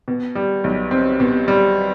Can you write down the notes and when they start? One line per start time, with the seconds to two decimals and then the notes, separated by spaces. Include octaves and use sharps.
0.08 B2
0.35 G3
0.64 B1
0.91 C4
1.20 B2
1.48 G3